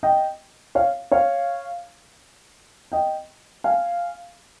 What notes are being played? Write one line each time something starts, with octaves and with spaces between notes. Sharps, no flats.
D#5 G5
C#5 F5
C#5 F5
D#5 G5
F5 G#5